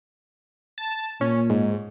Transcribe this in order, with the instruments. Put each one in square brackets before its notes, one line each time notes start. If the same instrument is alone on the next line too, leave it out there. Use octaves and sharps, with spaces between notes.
[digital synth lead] A5
[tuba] A#2 [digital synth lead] C#4
[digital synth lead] G#2